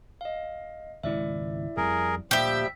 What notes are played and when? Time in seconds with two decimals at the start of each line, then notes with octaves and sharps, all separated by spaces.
0.21 D#5 F5
1.04 G#1 C#2 B2 E4 D5 E5
1.77 F2 G3 G#4 A#4
2.31 D2 A#2 F3 G3 G4 E5 E6